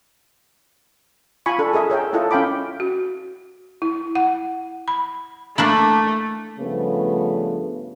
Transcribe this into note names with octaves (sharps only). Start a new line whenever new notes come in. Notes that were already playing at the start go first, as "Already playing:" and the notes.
F4 G#5 B5 C#6
D4 A4
G#4 A#4 D#5 E5
A#4 C#5 E5 G5
E4 F4 A4 C#5 D#5
C#4 F5 G5 B5 D6
F#4
E4
F#5
B5
A3 A#3 D4 E4
G2 C#3 F3 A3 B3